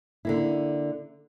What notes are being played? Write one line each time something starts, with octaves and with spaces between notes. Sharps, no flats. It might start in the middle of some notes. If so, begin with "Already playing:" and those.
D3 A#3 E4